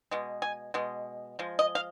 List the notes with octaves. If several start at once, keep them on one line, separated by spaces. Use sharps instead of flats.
B2 G#3
G#5
B2 G#3
F3 G#3
D#5
F5